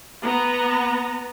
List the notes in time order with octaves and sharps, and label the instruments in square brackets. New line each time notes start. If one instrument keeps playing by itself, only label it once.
[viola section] B3 A#5